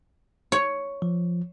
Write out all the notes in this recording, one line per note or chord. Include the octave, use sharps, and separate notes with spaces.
C#5
F3